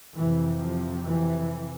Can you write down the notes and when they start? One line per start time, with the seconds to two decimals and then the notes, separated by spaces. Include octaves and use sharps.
0.15 F2 C3 E3
0.59 F3
1.04 E3